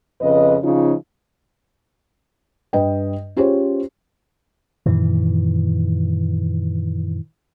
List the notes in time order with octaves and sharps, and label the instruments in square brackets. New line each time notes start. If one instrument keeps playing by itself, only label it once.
[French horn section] F2 C#3 B4 D#5
C#3 F3 C#4 D#4 F4
[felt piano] G2 B4 D#5 G5
C#4 F4 G4 G#4 C5 C#5
[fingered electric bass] F#2 A#2 D#3 E3